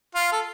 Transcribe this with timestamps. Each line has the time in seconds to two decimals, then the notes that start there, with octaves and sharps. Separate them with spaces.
0.15 F4
0.32 A4